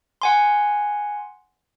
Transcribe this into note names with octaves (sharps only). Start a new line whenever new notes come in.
F#5 G#5 C6